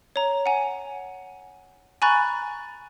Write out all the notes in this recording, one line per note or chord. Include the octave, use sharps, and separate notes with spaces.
C#5 A#5
F#5 G#5
G#5 A#5 B5 C#6 F#6 A6